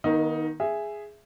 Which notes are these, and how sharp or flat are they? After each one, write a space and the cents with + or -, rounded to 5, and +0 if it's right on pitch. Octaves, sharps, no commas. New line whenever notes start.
D#3 +0 B3 -40 D#4 +15
G#4 +0 E5 +10